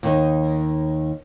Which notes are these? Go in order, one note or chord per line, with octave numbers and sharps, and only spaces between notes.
D#2 D#3 D#4